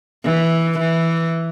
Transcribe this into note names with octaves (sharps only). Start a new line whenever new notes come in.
E3
E3